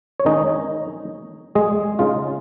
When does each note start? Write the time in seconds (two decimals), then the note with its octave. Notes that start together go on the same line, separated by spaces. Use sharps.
0.20 C#5
0.25 D#3 G#3 C#4 D#4 D#5
1.55 G#3 G#4
1.99 C#3 G#3 D#4 F4